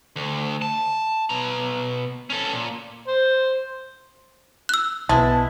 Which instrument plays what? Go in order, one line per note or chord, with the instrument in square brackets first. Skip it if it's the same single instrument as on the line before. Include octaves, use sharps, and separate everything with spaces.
[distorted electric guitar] D2
A5
B2 A#5
C#4 A4
A#2
[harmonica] C5
[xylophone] E6 F#6
[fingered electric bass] B1 [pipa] G#3 E4 [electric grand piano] B3 A5